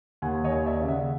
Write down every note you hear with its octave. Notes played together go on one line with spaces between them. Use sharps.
D#2 F#5 G#5
C#5 D#5
D#2
D5 E5
C#3
E5 F#5